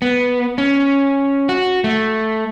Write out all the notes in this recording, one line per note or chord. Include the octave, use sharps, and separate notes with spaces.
B3
C#4
F#4
A3